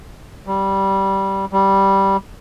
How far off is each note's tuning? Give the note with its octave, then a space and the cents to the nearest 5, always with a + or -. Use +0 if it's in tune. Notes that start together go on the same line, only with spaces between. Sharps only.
G3 -10
G3 -5